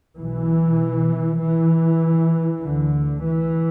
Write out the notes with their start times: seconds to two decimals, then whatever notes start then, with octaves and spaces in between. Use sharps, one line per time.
0.18 B1 B2 E3
1.41 E3
2.62 D2 D3
3.24 E3